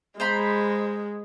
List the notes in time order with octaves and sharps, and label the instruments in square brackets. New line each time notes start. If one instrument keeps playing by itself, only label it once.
[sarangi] G#3 [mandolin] C5 A#5 B5